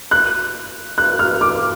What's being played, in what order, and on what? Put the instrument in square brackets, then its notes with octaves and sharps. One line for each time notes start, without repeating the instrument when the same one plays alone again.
[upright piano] F#6
F#6
F6
D6